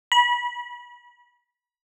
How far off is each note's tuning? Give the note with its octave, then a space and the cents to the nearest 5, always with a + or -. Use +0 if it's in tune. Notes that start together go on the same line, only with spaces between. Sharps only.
B5 -30